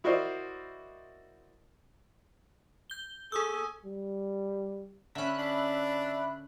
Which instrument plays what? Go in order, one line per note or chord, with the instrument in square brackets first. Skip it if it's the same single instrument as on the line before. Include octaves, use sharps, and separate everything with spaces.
[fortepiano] E4 F#4 A#4 C5 D5 D#5
[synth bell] G6 G7
[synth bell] G#4 D#6 E6 [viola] A4 G#5
[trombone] G3
[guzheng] D3 C#4 [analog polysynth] E5 B5 F#6
[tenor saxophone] D4